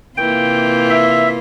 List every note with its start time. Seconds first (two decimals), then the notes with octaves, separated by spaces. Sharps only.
0.17 C3 E3 A#3 F4 G5
0.90 E5